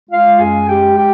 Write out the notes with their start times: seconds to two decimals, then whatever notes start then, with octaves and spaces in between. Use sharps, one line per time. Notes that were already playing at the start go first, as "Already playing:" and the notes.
0.10 G#3 F4 F5
0.39 F#2 G#4 G#5
0.67 G#3 G4 G5
0.96 G4 G5